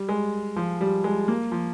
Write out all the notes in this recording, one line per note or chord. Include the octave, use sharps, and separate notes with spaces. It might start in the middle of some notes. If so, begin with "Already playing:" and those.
Already playing: G3
G#3
F3
G3
G#3
A#3
F3